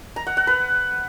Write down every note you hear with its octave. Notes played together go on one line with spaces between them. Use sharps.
A#5
F#5
F#5
B4